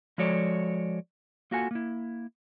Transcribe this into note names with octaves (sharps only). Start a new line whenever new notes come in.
F3 G#3 F#4 A4 C#5 D5
A#3 F4 F#4 A4 F#5 G#5
A#3 E4